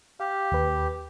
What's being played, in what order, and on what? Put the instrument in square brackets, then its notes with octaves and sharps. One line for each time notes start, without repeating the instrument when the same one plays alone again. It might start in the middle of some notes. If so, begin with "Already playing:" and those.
[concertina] G4 [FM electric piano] F5
[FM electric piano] D#2 B4